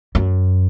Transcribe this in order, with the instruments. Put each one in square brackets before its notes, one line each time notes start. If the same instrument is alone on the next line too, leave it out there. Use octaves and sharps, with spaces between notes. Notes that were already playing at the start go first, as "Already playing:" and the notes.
[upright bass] F#2